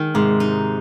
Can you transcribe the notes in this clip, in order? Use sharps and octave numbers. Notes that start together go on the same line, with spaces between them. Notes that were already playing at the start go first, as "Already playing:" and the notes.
Already playing: D#3 G#3
G#2 C3
D#4